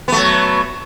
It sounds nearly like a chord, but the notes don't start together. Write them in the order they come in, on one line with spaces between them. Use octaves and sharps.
B3 A3 F#3